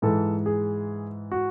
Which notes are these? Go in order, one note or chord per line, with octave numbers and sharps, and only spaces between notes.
G#2 E3 G#3 A4
G#4
F#4